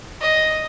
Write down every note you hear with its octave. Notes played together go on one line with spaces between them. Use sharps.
D#5